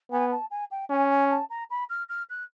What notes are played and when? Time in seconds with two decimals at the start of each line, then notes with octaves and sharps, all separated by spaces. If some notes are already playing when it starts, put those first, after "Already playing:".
0.11 B3 G#5
0.31 A5
0.50 G#5
0.71 G5
0.90 C#4 G#5
1.10 G#5
1.30 A5
1.50 A#5
1.70 B5
1.89 F6
2.09 F6
2.29 F#6